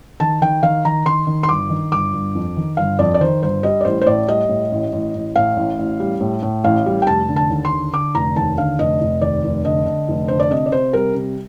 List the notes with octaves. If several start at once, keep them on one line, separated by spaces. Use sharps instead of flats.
D#3 A5
D#3 G5
D#3 F5
D#3 A#5
D#3 C6
D#3
C6
G1 D6
D#3
G1 D6
G1
F2
D#3
G1 F5
F2 D5
D5
D#3 C5
G1 C5
G3 D#5
D5
A1 C5
C5
A2 D5
G3 D#5
A2
A1
A1
A1
A2 F5
A1
A1
G3
A2
A2
A1 F5
G3
G5
F1 A5
D3
A5
D#2
C6
D3
D3 D6
F1 A#5
D#2 A5
D3 F5
F1 D#5
F1
D#2 D5
F1
D3 D#5
D3
F1
D3 C5
D5
C3 D#5
D5
C3 C5
G3 A#4
C3